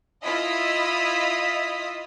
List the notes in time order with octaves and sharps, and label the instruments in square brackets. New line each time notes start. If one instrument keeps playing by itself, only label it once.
[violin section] E4 F4 D#5 D#6 E6 B6